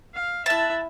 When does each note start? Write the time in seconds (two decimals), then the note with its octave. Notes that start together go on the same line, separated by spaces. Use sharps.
0.14 F5
0.46 E4 E5 A5 F#6